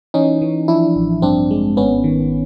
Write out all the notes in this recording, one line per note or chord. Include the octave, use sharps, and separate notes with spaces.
E3 C#4 D#4
E3
F3 D4 E4
A1
G2 C4 D4
G#3
G#1 B3 C#4
D#3